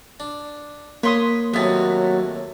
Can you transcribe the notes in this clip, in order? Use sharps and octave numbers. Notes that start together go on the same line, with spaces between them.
D4
A#3 B4 C#5 C6 D#6
D#2 A2 F#3 B3 C4 A5